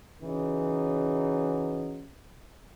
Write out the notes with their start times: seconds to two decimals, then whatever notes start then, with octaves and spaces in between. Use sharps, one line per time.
0.22 C#3 E3 F#3 D#4